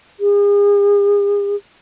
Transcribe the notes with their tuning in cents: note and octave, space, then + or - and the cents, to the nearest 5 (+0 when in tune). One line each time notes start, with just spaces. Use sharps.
G#4 -40